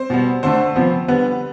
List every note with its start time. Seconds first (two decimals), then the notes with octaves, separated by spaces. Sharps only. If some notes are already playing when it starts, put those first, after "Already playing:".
Already playing: C4 C5
0.10 B2 G3 B3
0.43 D3 A3 C4 C5
0.76 C3 F3 B3
1.08 D3 G3 B3 B4